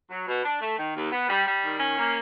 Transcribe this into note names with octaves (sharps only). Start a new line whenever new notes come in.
F#3
B2
D4
A3
D#3
D#2
B3
G3
G3
D#3
C#4
A#3